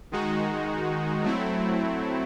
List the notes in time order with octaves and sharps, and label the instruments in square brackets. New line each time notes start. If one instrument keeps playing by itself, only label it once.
[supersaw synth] D#3 G#3 D#4 F#4
F#3 A3 C4 E4